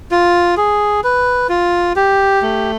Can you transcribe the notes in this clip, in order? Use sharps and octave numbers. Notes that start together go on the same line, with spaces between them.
F4
G#4
B4
F4
G4
A3